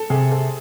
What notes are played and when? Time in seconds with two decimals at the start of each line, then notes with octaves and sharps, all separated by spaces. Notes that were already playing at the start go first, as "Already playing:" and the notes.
Already playing: A4
0.10 C3 G#4
0.31 A4